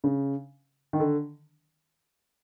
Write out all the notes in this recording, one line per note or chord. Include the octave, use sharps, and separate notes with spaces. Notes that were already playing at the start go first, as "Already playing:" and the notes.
C#3
D#3
D3